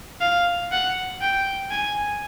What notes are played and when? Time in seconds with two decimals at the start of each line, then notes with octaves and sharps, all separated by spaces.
0.21 F5
0.72 F#5
1.21 G5
1.71 G#5